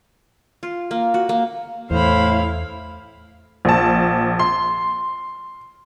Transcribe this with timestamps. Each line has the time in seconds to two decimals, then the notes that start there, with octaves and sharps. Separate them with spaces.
0.63 F4
0.91 A#3
1.14 F#4
1.29 A#3
1.91 E2 A2 E4 C5 F5 B5
3.65 A#1 A5
4.39 C6